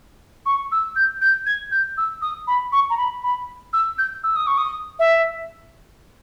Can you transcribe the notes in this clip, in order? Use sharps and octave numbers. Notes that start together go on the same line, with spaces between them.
C#6
E6
G6
G6
G#6
G6
E6
D#6
B5
C#6
A#5
B5
B5
E6
G6
E6
D#6
C#6
D#6
E5